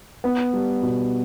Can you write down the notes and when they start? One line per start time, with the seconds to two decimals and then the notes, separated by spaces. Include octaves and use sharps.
0.24 B3
0.53 G3
0.82 B2